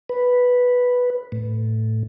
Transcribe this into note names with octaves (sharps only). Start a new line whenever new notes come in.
B4
A2